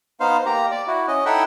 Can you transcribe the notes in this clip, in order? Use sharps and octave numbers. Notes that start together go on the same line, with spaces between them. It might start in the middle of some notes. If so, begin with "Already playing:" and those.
B3 D#4 C5 F5
A#3 G4 A#5
D5
E4 F#4
C#4 D#5
D#4 E4 A4 E5 F#5 G5